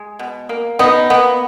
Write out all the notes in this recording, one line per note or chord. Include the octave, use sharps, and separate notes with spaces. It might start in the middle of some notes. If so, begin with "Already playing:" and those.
Already playing: G#3
B2
A#3
B2 B3 D#4
A#3 B3